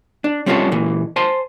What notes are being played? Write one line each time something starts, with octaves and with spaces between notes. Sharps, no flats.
D4
G3 C4 C#4 F4 F#4 A4
A#2 E3
C5 G#5 A5 C6